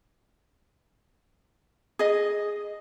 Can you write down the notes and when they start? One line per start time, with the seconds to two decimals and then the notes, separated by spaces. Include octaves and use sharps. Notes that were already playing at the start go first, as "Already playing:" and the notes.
1.99 G#4 D#5